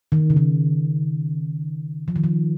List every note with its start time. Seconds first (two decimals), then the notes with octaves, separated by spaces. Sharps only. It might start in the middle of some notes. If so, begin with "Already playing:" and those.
0.12 D#3
0.30 C#3
0.37 D#3
2.08 F3
2.16 D#3
2.24 F3